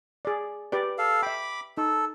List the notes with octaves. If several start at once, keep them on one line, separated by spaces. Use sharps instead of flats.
G#4 D5
G4 B4 D5
A4 F5
E5 G5 B5 D6
D#4 A4